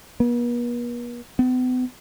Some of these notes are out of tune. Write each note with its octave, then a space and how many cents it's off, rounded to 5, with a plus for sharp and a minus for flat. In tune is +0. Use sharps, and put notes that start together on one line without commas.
B3 -45
B3 +40